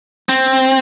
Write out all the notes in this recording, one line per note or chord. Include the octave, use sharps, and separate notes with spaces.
C4